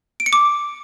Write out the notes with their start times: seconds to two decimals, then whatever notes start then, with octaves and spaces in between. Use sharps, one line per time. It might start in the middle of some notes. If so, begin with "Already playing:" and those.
0.20 D7
0.26 C#7
0.33 D6